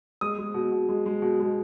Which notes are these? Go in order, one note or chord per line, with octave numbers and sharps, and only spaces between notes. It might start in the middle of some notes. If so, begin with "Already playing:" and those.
G#3 D#6
G#3
B2
B2
G#3
G#3
B2
G#3